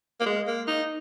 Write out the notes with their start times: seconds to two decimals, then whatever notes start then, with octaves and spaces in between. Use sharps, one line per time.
0.21 A#3
0.26 G#3
0.48 A#3
0.68 D#4